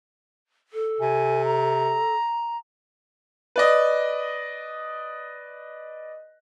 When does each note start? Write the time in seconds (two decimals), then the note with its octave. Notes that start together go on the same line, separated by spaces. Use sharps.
0.73 A4
1.01 C3 G#5
1.45 A#5
3.56 B4 D5 D#5